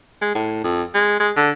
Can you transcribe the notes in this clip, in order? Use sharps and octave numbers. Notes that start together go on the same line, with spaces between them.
G#3
A2
F2
G#3
G#3
D3